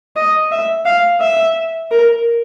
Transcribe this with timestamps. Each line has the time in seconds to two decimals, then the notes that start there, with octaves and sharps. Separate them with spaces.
0.16 D#5
0.52 E5
0.86 F5
1.20 E5
1.91 A#4